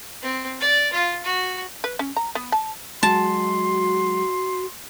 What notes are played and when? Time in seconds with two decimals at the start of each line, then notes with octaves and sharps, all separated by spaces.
0.22 C4
0.61 D5
0.93 F4
1.24 F#4
1.84 B4
1.99 C#4
2.17 A#5
2.35 B3
2.52 A5
3.03 F#3 G#3 F#4 A5 C6